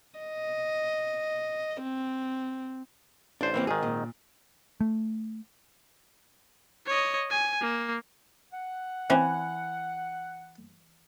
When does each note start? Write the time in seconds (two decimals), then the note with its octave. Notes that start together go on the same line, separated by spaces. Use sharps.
0.19 D#5
1.82 C4
3.41 A1 D4 C5
3.54 E3 A#3 C4
3.67 G#1 D#3 G#4
3.83 A#2
4.81 A3
6.87 C#5 D#5
7.30 G#5
7.61 A#3
8.52 F#5
9.10 E3 C4 C#4